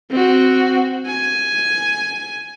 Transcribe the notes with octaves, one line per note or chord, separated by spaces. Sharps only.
C4 F#4
G#5